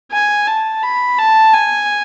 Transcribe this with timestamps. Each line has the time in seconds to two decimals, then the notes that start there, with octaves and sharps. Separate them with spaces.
0.12 G#5
0.47 A5
0.83 B5
1.18 A5
1.53 G#5